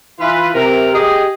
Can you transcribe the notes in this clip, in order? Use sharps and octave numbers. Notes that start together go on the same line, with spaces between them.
E3 F4 B4
C3 A#4
G4 G#4 D#5